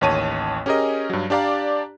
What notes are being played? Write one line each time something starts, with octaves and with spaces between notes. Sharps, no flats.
A1 D#2 C#5 A5 D#7
C#4 G4 G#4 A#4 D#5
G2 F#3
D4 G4 D5 F5 A#5